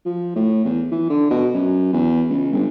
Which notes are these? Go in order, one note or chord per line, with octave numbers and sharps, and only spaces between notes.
F3
A2
E2
E3
D3
B2
F#2
E2
C#2
G1